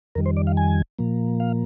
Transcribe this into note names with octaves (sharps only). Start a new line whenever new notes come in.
F2 D#3 G3 A#4
C5
D5
F5
G#5
A#2 F3 A#3
F5